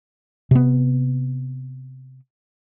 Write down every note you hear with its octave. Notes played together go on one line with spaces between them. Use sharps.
C3 B3